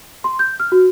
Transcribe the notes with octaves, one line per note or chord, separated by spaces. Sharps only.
C6
G6
F6
F#4